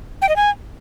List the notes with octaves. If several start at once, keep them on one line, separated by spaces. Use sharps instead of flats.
G5
D#5
G#5